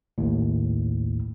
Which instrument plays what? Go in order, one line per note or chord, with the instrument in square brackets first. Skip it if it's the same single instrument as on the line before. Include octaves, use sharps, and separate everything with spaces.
[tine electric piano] A#1 D#2 A2